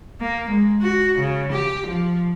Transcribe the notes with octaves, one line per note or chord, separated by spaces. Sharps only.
A#3
G#3
F#4
C#3
G4
F3